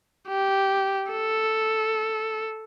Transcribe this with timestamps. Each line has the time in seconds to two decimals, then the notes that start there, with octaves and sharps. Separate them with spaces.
0.28 G4
1.11 A4